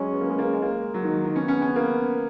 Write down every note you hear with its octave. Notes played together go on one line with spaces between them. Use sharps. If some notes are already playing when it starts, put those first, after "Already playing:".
Already playing: F#3 G#3 C#4
B3
A#3
G#3
A#3
G#3
A#3
G#3
F#3
D#3
D#3
B3 C#4
C#4
C#4
A#3